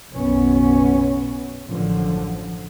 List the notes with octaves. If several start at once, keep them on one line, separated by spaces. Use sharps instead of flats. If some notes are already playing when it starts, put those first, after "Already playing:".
F#1 B1 F#2 B3 C#4
A1 F#2 D3 F3